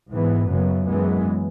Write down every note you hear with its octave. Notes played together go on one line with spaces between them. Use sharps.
G#2 E3 B3
F#2 C#3 F#3 B3
F#2 E3 G#3 B3